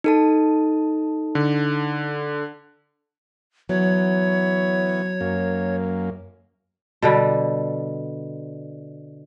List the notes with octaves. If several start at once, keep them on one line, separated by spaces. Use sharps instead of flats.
D#4 A4 A5
D3
E3 F#3 B3 C#5
F#2 A#3
B2 D3 G3